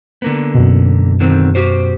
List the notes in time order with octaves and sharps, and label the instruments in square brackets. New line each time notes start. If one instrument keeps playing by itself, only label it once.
[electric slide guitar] D3 A#3 B3
[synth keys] F#2 B2
[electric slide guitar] D3 D#3 C4
F#4 G4 C5